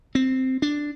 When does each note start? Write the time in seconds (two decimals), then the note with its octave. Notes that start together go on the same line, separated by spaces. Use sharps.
0.15 C4
0.62 D4